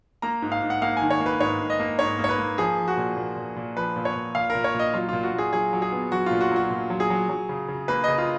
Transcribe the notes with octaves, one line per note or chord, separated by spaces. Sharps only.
A#3 A#5
G#2
F5
G#2
F#5
A#3 F5
G#5
D#3
C#5
A#3
B4
G#2 C#5
G#2
D#5
A#3
G#2 C#5
A#3
C#5
B4
A#3
F3 G#4
F3
F#4
A#2
A#2
A#2
A#2
F3 B4
A#2
C#5
A#2
A#2 F5
A#4
A#2
C#5
A#2 D#5
F#3 F4
A#2 F4
F#4
A#2
G#4
F#3 G#4
F#3
G#4
B3
F#3 F#4
A#2 F4
F#4
F#3 F#4
A#2
F#3
G#4
F#3
F#3
C#3
C#3
A#3 B4
C#3 D#5
F4